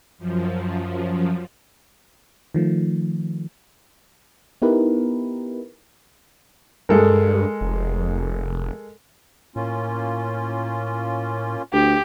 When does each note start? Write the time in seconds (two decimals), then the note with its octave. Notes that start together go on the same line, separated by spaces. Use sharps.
0.18 F#2 F3
2.54 D#3 F3 A3
4.62 B3 D#4 E4 G4 A#4 B4
6.89 G2 G#3 A4 A#4
7.61 F1
9.56 A2 A#3 C#4 F4
11.73 D2 B3 G4